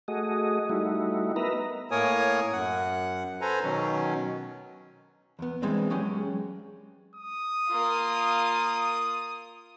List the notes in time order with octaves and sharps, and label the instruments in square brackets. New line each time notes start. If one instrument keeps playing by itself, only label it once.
[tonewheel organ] A3 F#4 G#4 D#5
G3 A3 D#4 E4 F#4
B3 A#4 B4 D#5 E5 A#5
[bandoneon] A2 A#3 A#4 C#5 G#5 D#6
F#2 F#5
A4 B4 C5 G#5 A#5
B2 D#3 F#3 C#4
[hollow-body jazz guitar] E2 B3
E3 G3 G#3 B3 C4 D4
F#3 G#3 C#4 G4 G#4
[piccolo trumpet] D#6
[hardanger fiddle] A#3 F4